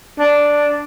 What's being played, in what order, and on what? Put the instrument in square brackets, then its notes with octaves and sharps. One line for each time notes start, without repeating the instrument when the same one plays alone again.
[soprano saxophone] D4